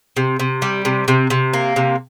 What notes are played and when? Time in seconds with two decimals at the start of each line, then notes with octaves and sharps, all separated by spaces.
0.17 C3
0.39 C3
0.62 G3
0.85 C3
1.08 C3
1.30 C3
1.53 A#3
1.76 C3